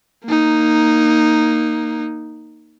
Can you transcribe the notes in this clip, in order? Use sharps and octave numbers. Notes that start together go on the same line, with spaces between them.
A#3 D#4